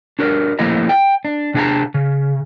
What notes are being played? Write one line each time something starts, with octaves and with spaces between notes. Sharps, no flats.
D4 F#4 A#4 C5 D5
F3 A3 A#3 E4 D#5 A#5
G5
D4
C3 D4 G#4 D5 A5 A#5
C#3